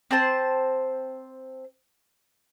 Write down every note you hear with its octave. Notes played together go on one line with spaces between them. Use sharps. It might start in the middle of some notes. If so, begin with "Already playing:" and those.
C4 C5 A5 C6